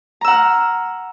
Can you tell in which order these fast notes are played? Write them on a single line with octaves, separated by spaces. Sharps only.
A#5 E6 F#5 F6